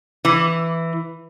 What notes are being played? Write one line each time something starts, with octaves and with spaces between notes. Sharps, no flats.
E3